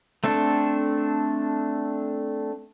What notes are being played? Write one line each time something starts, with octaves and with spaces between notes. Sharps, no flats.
A3 C4 D4 A4